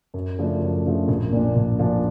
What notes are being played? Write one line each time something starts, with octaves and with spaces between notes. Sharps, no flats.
F#2
C#3 F3 A3 D4
F#2
C#3 F3 A3 D4
A#1
A#2 F3 A#3 D4
A#1
A#2 F3 A#3 D4